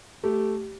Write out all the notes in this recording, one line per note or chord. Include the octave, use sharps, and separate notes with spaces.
A3 G4